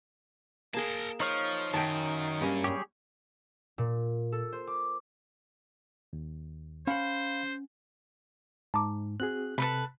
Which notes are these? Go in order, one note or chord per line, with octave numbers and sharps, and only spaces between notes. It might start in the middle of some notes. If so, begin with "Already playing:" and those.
A#3 G#4 A#4 A5
F3 D#4 C#5 F5
F#2 D#3 G5 A5
G2 A#3 C#4
G3 G4 G#4 C#5
A#2
A4
C5
D6
D#2
C#4 C5 F5 F#5 B5
G#2 A5 A#5 D6
C4 F#4 G#4 F#6
C3 A4 B4 B5